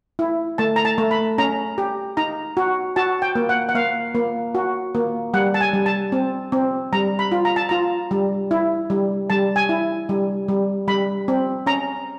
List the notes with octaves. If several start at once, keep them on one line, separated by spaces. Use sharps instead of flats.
E4
A3 A5
A#5
A5
A3
B5
C#4 A#5
G4
D#4 A#5
F#4
F#4 A5
G5
A#3
F#5
F#5
A#3 F5
A#3
F#4
A#3
G3 F#5
A5
G#5
G3
A5
C4
C4
G3 A#5
B5
F4
A#5
A5
F4 A#5
G3
E4
G3
G3 A5
G#5
E4
G3
G3
G3 B5
C4
C#4 A#5